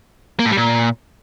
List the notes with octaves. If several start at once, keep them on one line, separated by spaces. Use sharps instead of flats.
A#3
A2
G3
A#2